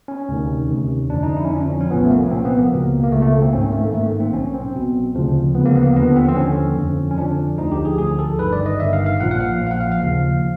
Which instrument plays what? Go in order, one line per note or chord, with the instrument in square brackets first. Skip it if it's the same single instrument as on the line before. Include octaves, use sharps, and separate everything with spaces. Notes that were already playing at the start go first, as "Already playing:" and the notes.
[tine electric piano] C#4
D2 C3 D#3
D2 C3 D#3
F2 D3 F3 D4
D#4
E4
C#4
F2 D3 F3 D4
C#4
C#4
C2 A#2 F3 B3
A3
A#3
C#4
C2 A#2 F3 C4
B3
A#3
C#2 B2
A#3
C#2 B2 A3
A3
A#3
C4
G#1 G#2 D#3 C#4
C4
A3
A#3
G#1 G#2 D#3 A3
A#3
C4
B1 B2 C#4
C4
B1 B2
D2 C#3 F3
D2 C#3 F3 B3
A#3
B3
A#3
D#2 D3 F3 B3
C4
C4
D#2 D3 F3 C#4
F2 D3 F3
C#4
F2 D3 F3 D4
D2 D3 F3 D#4
G4
G#4
D2 D3 F3 G#4
A4
G1 G2 D#3 B4
D5
D#5
G1 G2 D#3 E5
F5
F5
A#1 A#2 F3 F#5
F#5
F5
A#1 A#2 F3
F5
F#5
F5
F5
D#2 C#3 F3